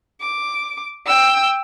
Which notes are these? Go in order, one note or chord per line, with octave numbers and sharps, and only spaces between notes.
D6
G5 E6